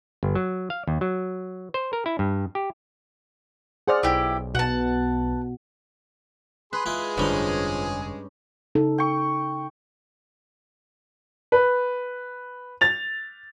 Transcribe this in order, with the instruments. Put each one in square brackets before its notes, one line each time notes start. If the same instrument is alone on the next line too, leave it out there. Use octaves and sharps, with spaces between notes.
[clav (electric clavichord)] G1
F#3
F5
D#2
F#3
C5
A#4
E4
G2
G4
[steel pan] G#4 C5 D5 [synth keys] F#5 F6
[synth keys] B1 [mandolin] E4 G4
[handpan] B2 [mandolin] F#5 A5
[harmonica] G#4 C6 [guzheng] B4
[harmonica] G#3 G#4 [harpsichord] E4 F4
[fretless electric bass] F1 D3 G3 [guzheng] G2 C#4 [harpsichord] F3 D#4
[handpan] C#3 D#4 A4
[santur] G5 C#6
[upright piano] B4
A6 F7